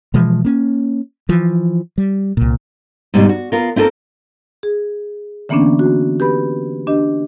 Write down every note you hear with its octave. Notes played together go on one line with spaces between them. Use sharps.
B2 E3 F3 G#3
A#3 C#4
E3 F3
G3
C2 A#2
G#2 B2 G3
F#4
B3 F4 A#4
C4 E4 F4 A4 A#4
G#4
D3 E3 A#3 B3 C#4 D4
F#4
G4 B4 B5
D4 G4 D#5